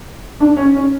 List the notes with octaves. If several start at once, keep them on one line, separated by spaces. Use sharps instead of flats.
D4
C#4
C#4